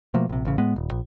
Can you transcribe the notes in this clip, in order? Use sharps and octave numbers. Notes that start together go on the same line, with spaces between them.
B2 F3 A3 A#3
A#1 C3
A1 C#3
A2 G#3 B3
D#1
A#1